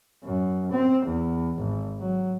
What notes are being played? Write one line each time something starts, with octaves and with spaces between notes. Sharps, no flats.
F#2
C4
E2
G#1
F#3